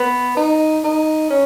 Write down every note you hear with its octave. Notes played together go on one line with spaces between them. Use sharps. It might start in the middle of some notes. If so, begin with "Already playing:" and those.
Already playing: B3
D#4
D#4
C#4